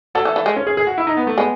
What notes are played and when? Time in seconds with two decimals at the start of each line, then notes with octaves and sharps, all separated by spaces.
0.15 F#3 A4
0.25 E3
0.36 E3
0.46 G#3
0.56 C#4
0.67 G#4
0.77 G#4
0.87 F#4
0.98 E4
1.07 D#4
1.17 B3
1.27 A3
1.38 G#3 B3